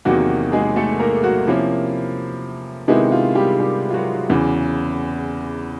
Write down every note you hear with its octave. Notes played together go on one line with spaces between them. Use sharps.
E2 C3 D#3 F#3 A#3 F#4
G#3 G#4
A3 A4
A#3 A#4
F#3 F#4
C3 F3 A#3 C#4 E4
C3 D#3 G#3 B3 E4
F4
G3 G4
G3 G4
F4
F#3 F#4
E2 C#3 E3